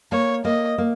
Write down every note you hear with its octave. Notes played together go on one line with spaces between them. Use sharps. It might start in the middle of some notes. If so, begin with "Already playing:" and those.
A#3 C#5
A#3 D#5
A#3